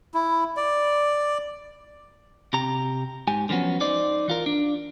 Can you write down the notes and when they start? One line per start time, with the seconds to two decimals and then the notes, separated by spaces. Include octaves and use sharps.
0.14 E4
0.57 D5
2.53 C3 G4 A#5
3.27 G#2 G4 G#5
3.49 D3 F3 F#3 B3 C#4
3.80 D#4 C5 D5
4.28 E3 F4 A#4
4.46 D4